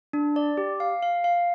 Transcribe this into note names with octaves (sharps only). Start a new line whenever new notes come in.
D4
D5
G4
F5
F5
F5